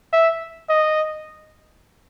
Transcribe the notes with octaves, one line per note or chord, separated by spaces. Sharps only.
E5
D#5